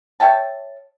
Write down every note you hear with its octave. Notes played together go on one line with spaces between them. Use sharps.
C#5 E5 G5 A5